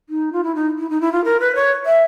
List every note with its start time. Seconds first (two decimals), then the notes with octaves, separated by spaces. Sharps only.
0.09 D#4
0.32 F4
0.44 E4
0.55 D#4
0.78 E4
0.90 D#4
1.01 E4
1.12 F4
1.24 A#4
1.40 B4
1.55 C#5
1.86 E5